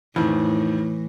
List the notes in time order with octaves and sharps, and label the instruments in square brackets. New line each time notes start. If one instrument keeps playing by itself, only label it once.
[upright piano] F2 D#3 [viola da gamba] A2 [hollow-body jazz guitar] E3